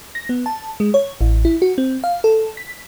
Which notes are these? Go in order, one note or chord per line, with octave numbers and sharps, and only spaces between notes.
A#6
B3
A5
G#3
C#5
A1
E4
F#4
C4
F5
A4
B6